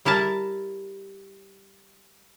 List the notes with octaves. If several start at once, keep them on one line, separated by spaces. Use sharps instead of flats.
G3 E4 A#4 A5 A#5